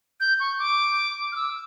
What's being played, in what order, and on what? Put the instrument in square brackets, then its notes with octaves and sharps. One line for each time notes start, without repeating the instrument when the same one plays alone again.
[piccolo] G6
C#6
D6
F6
E6